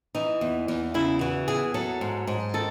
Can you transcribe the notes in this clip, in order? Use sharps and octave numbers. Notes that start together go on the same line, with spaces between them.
E3 D#4
E2
E2
C#3 E4
E3 F#4
E2 G#4
F#3 A4
G#2
G#2
D#3 A4